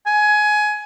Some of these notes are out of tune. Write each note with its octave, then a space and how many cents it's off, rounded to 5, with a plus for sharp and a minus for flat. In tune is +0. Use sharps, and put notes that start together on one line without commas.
G#5 +20